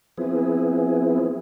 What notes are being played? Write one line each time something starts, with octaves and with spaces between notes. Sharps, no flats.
F3 B3 C4 E4 G#4